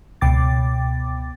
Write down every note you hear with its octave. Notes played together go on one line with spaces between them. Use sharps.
C#2 B2 G5 D6 A6